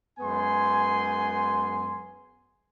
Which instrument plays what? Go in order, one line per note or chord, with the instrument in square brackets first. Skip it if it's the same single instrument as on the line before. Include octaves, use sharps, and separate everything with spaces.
[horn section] F#2 G#3 B3 G#5 C6